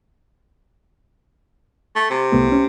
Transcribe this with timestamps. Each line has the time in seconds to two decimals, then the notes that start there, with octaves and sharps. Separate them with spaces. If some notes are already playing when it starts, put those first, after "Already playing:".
1.96 A3
2.10 C3
2.32 C2 A3 B3
2.52 C#4